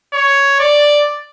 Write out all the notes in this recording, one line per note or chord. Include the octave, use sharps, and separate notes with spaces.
C#5
D5